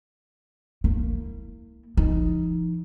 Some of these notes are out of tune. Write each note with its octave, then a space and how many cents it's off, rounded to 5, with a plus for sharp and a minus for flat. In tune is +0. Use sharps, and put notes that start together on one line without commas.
A#3 -30 E4 -25
F3 -40 D#4 +5